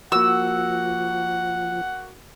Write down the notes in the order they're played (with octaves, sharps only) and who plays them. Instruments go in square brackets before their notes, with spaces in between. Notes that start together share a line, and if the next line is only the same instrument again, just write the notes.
[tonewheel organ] F3 [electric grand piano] A#3 F#4 [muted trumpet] F#5 [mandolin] E6